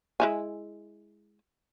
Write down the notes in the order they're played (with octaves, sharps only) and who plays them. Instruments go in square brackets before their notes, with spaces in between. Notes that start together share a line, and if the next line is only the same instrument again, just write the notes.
[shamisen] G#3 E4 G#5